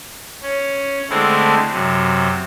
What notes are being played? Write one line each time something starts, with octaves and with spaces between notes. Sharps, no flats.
C#4
D3 G#3 A3 C4 E4
F#2 C3